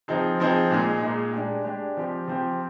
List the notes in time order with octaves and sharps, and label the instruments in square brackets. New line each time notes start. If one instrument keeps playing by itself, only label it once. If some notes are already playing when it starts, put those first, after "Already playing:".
[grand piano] F3 C4 D#4 G#4
F3 C4 D#4 G#4
A#2 G#3 D#4 G#4
A#2 G#3 D#4 G#4
G#3 D4 G4
G#3 D4 G4
F3 C4 G4
F3 C4 G4